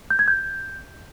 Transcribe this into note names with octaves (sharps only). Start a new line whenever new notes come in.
G6
G#6
G6